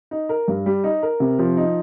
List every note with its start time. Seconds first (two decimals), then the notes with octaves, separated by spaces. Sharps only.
0.11 D#4
0.29 A#4
0.48 G2
0.66 G3
0.84 D#4
1.03 A#4
1.20 C3
1.39 F3
1.57 D#4